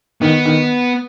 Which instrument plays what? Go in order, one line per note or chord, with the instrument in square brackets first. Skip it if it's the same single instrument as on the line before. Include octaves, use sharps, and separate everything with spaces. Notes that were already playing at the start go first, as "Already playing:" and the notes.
[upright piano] D#3 [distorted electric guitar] B3
[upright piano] D#3